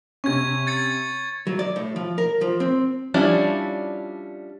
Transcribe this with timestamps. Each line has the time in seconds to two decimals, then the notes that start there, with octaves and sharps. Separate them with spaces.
0.24 C3 C#4 C#6 G#6
0.67 G#6 A6 C#7
1.47 F#3
1.59 D5
1.76 A2
1.96 F3
2.18 A#4
2.41 F3
2.60 C4
3.14 F3 G3 C#4 D4 E4